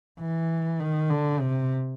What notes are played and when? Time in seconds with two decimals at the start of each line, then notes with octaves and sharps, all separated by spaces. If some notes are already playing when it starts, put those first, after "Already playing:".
0.20 E3
0.80 D#3
1.10 D3
1.40 C3